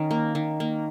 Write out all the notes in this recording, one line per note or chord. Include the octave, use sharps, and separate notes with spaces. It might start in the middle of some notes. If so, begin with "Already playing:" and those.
Already playing: D#3 C#4
A#3
D#3
A#3